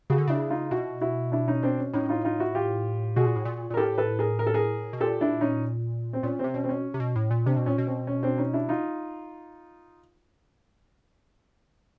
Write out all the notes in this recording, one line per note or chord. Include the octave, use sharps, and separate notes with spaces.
C#3 F#4 G#4
D3
C#3 D4 E4
D#4 F4
B2 E4 F#4
E4 F#4
D4 E4
C#4 D#4
C4 D4
C#4
A2 C#4 D#4
D#4 F4
D#4 F4
E4 F#4
F4 G4
B2 F#4 G#4
A#2
A2
A#2
A#2
A#4
A2 G4 A4
A4 B4
G#4 A#4
A#4
A4
G#4 A#4
B2
A#2 G4 A4
D4 E4
C#4 D#4
C4
A#2 C#4
C3 C4
B2 C#4
C4
C#4
C3
B2
A2
A#2
C3 C4 D4
B2
A#2 C#4
B2
C4
C#4
C4 D4
C#4 D#4
D4 E4
D#4 F4